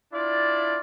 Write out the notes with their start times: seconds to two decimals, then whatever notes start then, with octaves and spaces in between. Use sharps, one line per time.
0.12 D4 E4 F4 D5